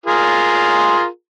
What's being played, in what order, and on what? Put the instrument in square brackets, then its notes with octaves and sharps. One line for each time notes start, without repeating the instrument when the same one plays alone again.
[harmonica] F4 G#4 A#4